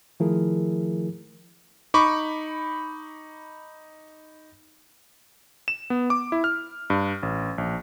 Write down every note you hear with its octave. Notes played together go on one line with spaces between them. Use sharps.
D#3 F3 A3 E4 G#4 A#4
D#4 B5 C#6 D6
E7
B3
D6
E4
F6
G2
A1
A#1